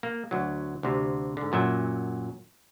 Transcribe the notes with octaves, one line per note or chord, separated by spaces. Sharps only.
A#3
D2 F#3
D2 C3
G#2 D3
F#2 A#2 F#3 E5